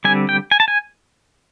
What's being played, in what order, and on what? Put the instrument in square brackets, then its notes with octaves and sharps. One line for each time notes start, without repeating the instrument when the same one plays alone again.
[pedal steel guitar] D3 G3 C4 G#5
G5
G#5
A5
G#5